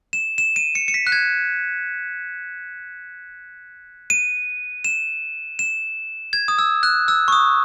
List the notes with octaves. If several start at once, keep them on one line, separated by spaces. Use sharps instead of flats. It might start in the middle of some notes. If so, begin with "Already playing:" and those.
E7
E7
D#7
C#7
C#7
B6
F#6
G#6
D#7
E7
E7
G#6
D#6
E6
F#6
E6
C#6
D#6